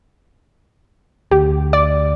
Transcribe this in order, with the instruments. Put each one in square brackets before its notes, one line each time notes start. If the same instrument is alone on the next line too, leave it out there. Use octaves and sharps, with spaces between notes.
[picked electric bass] D2 [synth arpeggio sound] G4
[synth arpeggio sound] D5